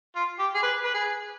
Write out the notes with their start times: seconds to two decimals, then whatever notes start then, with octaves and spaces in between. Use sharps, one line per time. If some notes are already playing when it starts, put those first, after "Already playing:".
0.16 F4
0.39 G4
0.54 G#4
0.62 B4
0.84 B4
0.94 G#4